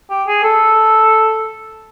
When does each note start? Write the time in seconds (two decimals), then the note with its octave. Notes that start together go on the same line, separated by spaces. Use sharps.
0.10 G4
0.27 G#4
0.44 A4